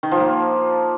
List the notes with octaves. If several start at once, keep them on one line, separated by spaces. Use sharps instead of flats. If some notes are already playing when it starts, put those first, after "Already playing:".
D#3
F3
A#3